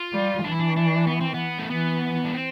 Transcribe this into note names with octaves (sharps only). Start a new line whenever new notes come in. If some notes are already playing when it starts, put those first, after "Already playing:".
Already playing: F4
G3
E3 D4
E4
D4
D4
B3
C4
B3
A3
E3 B3
D4
C4